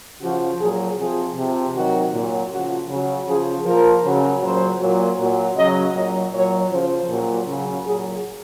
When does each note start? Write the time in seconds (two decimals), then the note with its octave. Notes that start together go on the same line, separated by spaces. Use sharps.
0.21 C#3 F3 F#4
0.59 A#2 F#3 G#4
0.97 C3 F3 G#4
1.36 C3 F3
1.74 C3 D#3 F#3 F#4
2.13 A#2 F#3
2.51 C#3 F3 F#4
2.89 C#3 F#3
3.27 C#3 F3 G#4
3.65 A#2 F3 A#4
4.04 C#3 F#3
4.42 A#2 F#3 C5
4.80 A#2 F#3
5.19 A#2 F#3
5.56 C#3 F#3 D#5
5.95 A#2 F#3 D#5
6.33 A#2 F#3 C#5
6.71 C#3 F3 C5
7.09 A#2 F#3
7.47 C#3 F#3
7.85 A#2 F#3 G#4